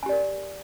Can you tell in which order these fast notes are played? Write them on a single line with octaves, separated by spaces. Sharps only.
G#5 G4 D5 A#4